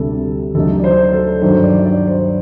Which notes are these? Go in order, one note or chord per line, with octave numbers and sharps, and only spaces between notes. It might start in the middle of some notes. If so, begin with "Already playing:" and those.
Already playing: D2 C3 G3 D4 A4
D2 D3 F#3 A3 D#4 A4
D5
C5
A4
G2 D#3 F#3 C5
D5
D5
C5